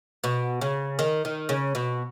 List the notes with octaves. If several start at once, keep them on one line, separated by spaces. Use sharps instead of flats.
B2
C#3
D#3
D#3
C#3
B2